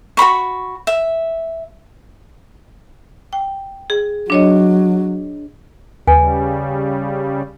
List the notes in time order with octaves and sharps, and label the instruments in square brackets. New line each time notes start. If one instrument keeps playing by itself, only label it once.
[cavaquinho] F#4 C5 B5 C#6
E5
[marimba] G5
G#4
[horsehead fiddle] F#3 [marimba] D4 C#5 D#5
[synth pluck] D#2 [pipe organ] C#3 G3 [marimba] B4 [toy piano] G#5